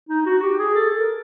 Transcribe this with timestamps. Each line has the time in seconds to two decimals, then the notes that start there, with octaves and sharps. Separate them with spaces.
0.09 D#4
0.26 F#4
0.42 G4
0.59 G#4
0.75 A4
0.97 A#4